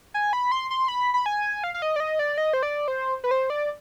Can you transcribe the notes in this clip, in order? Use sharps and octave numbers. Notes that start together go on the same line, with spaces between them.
G#5
B5
C6
C6
B5
B5
G#5
F5
F5
D#5
D5
D#5
D5
D#5
C5
D5
C5
B4
C5
D5